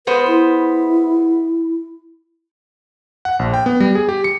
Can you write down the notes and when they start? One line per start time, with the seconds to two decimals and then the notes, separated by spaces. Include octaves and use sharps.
0.07 G#3 B3 B4 C5
0.27 E4
3.25 F#5
3.39 A#1
3.54 G5
3.66 B3
3.80 G3
3.95 G#4
4.09 G4
4.24 C#7